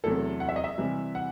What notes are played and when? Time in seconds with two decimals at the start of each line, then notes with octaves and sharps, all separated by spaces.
0.04 E2 C3 F#3 A3 E4 A4
0.40 F#5
0.49 E5
0.56 D#5
0.64 E5
0.78 C3 E3 G3
1.15 F#5